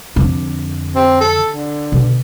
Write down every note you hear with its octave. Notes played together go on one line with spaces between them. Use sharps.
F2 D3
C4
A4
D3
B2